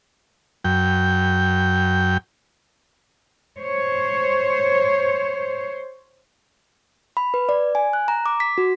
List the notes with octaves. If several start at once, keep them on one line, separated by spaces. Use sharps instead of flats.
F#2 G5
C5 C#5
B5
B4
D5
G#5
F#6
A#5
D6
B6
F#4